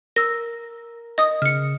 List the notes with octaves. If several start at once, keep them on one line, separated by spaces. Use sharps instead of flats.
A#4 E6 A#6
D#5 D#6
C#3 F6 C#7